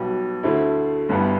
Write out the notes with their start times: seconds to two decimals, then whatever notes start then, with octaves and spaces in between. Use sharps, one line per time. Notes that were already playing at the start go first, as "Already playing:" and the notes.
Already playing: B1 B2 G3
0.43 D2 D3 A3 E4
1.09 G1 G2 G3 B3 E4